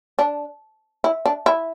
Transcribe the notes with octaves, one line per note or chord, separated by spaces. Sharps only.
D4
E4
D4
E4